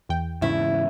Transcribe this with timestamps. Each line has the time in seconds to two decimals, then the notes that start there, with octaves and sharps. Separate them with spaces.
0.09 E2 G5
0.42 G#2 C#3 E3 E4